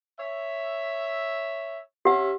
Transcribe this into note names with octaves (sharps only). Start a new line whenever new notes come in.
C#5 E5
C#4 G4 E5 F#5